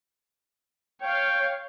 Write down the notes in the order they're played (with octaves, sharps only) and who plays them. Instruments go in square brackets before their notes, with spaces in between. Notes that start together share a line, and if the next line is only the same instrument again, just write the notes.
[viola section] C#5 F5 [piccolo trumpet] G5